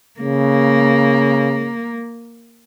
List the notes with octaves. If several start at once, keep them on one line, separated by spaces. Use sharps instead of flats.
C#3 A#3